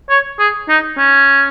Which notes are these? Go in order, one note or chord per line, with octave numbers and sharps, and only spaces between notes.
C#5
G#4
D#4
C#4